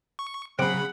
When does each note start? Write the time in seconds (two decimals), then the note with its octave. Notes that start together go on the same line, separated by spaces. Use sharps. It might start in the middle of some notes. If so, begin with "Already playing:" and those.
0.19 C#6
0.59 C#3 F#3 C4 G#4 F#5 B5 D6